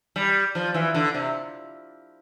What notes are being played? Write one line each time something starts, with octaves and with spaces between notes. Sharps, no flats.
G3
F3
E3
D3
C3